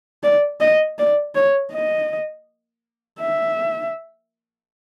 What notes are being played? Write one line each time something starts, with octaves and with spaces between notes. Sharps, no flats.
D5
D#5
D5
C#5
D#5
E5